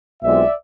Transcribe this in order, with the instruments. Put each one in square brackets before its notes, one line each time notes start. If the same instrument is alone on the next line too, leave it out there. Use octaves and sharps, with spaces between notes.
[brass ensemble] B1 B2 G#3 C4 F4 D5 E5